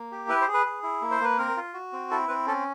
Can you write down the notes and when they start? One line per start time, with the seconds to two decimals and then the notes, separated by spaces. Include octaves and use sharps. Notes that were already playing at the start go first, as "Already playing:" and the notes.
Already playing: A#3
0.12 G4
0.29 E4 B4
0.41 C5
0.48 G#4
0.54 B4
0.66 G#4
0.83 E4
1.02 A#3
1.11 C5
1.21 A#3 B4
1.38 C4 A#4
1.57 F4
1.74 F#4
1.93 C4
2.11 E4 A4
2.28 C4 B4
2.46 C#4 A4